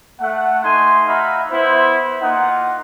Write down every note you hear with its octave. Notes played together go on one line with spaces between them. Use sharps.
A3 F#5
A3 D#4 G#5 C6
D#4 F#4 E5 F5 B5
B3 E4 C5
A#3 D#4 F4 F#5